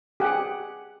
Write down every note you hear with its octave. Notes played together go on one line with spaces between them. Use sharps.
G4 G#4 F#5